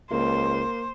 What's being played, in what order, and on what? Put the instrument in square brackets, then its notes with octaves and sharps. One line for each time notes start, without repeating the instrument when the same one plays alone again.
[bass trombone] C#2 [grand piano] A#3 [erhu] C5